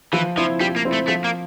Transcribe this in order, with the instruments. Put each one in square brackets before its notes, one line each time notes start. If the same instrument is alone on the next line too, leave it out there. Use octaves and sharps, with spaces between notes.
[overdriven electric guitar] E3 [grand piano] F3
[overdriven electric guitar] F3 [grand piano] C4 E4
[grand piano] F3 [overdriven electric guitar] G3
[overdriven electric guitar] A#3
[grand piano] C4 E4
[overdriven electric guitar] A3
[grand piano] F3 [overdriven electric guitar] A3
[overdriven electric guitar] A#3